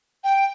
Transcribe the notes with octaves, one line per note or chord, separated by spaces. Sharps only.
G5